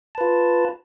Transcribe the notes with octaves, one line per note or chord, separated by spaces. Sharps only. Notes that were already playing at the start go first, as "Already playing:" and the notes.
F4 B4 A5